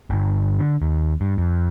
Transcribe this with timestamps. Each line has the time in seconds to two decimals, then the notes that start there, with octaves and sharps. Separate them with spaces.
0.10 G1
0.59 D3
0.82 D#2
1.21 G2
1.38 F2